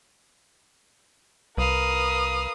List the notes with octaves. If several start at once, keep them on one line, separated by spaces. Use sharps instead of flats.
C2 A#4 B4 F5 D#6